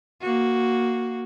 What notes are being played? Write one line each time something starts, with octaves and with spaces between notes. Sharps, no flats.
A#3 F#4